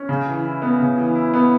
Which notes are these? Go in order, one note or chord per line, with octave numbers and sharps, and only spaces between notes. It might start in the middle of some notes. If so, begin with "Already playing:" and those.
Already playing: C#4
C#3
E3
E4
B3
C#3
E3
E4
B3